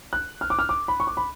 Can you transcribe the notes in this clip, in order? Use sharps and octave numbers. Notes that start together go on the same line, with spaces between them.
F#6
F6
D6
F6
D6
B5
C#6
D6
B5